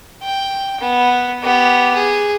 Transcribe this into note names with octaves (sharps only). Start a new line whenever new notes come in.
G5
B3
B3 G4
G#4